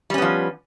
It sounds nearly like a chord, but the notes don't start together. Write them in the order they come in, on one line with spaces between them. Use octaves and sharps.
G3 C#4 B3 F3